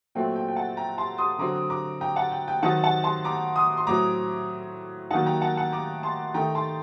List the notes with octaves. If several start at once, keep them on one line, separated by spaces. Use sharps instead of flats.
A#2 F#3 A3 C4 G5
G5
G5
F#5 A5
G5 A#5
A5 C6
C6 D#6
D3 F#3 C4 A#5 D6
A#5 D6
G5 A#5
F#5 A5
G5
G5
D#3 F#3 C4 D#4 F#5 A5
F#5 A5
A5 C6
A#5 D6
C6 D#6
C6
A2 F#3 C4 A#5 D6
D#3 F#3 A#3 D#4 F#5 A5
G5 A#5
F#5 A5
F#5 A5
A#5 D6
A5 C6
D#3 A3 D#4 G5 A#5
A5 C6